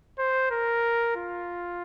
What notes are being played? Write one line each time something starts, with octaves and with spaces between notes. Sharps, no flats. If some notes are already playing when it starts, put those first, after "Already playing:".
C5
A#4
F4